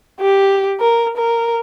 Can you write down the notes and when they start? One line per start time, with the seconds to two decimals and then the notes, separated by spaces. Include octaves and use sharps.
0.20 G4
0.80 A#4
1.17 A#4